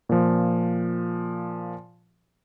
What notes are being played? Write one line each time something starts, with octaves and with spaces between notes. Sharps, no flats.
A#2 F3